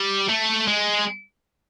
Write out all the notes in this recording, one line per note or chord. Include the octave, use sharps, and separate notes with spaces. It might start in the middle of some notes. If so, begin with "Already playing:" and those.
Already playing: G3
A3
G#3